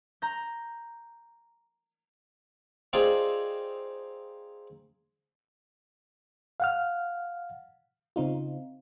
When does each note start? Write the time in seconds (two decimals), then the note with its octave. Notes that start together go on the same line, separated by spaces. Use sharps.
0.22 A#5 G6
2.93 C4 D#4 F4 G#4 D5
6.60 F5 F#5 F6
8.16 C#3 C4 D#4 F4